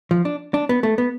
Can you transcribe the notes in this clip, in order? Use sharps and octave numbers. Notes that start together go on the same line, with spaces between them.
F3
D4
D4
B3
A3
B3